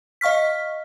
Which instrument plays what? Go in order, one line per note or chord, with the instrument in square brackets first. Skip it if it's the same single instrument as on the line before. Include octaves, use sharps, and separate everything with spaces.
[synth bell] D#5 F5 C#6 F6 B6